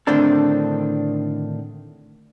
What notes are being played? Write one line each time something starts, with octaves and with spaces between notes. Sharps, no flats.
A2 D3 D#3 C4 D4 A4